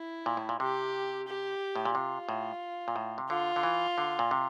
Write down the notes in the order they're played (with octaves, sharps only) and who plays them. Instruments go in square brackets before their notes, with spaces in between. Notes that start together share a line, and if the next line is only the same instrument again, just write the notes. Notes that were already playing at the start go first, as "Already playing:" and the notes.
Already playing: [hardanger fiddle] E4
[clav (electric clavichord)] A#2
A2
A#2
[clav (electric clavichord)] C3 [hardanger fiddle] G4
[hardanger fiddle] G4
[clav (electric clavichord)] A2
A#2
[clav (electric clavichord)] C3 [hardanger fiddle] F4
[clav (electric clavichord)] A2
A#2
A2
C3
[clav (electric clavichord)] D3 [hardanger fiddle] F4
[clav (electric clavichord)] D3
E3
D3
A#2
C3